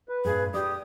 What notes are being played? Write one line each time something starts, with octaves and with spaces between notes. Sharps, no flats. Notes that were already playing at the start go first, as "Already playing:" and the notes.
B4
G2 A#2 G#4
G4 D5 D#6